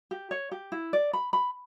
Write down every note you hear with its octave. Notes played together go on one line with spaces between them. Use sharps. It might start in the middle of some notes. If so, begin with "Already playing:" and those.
G4
C#5
G4
E4
D5
B5
B5